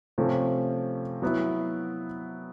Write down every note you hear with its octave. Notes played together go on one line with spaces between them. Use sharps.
C3 F3 A3 C#4
F#3 B3 E4